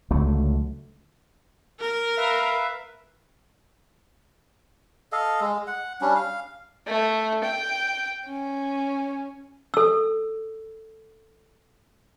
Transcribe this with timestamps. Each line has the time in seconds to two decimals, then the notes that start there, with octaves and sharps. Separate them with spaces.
0.11 C#2 D3 F#3 A3
1.80 A#4
2.17 B4 E5 F5
5.12 A4 D#5 F5
5.41 G#3
5.67 F#5
6.01 G3 C#4 D4
6.15 F5
6.88 A3
7.44 G5
8.27 C#4
9.74 A4 E6